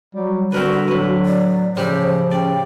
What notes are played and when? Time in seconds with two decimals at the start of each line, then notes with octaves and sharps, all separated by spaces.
0.15 F#3 G3
0.52 D3 G3 C4 F#4 A#4 B4
0.88 A2 F#3 B4
1.26 D5
1.77 A2 C#3 F3 G3 G4 C5
2.31 C#3 D5 G5